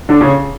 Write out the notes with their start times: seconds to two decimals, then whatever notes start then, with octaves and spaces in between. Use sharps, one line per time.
0.09 D3 D4
0.21 C#3 C#4